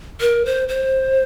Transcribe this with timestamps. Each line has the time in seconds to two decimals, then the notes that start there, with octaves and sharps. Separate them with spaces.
0.21 A#4
0.46 C5
0.69 C5